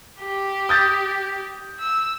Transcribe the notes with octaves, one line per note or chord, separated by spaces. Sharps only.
G4
D#6 G6 A6
E6